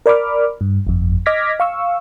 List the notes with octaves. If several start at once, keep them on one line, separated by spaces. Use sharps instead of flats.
A#4 D5 B5 D6 F6
G2
G1 F2
D#5 D6 F6 G#6 A#6 B6
F5 C#6 E6